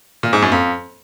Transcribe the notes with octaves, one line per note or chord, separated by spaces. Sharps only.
A#2
G#2
F#2
F2